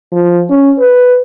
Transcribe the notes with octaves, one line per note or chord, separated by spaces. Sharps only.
F3
C#4
B4